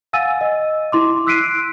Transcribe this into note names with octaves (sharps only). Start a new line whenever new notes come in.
F5 F#5 G#5 E6 A6 D#7
D#5
E4 C6 D6
E6 F#6 B6 C7 D7 D#7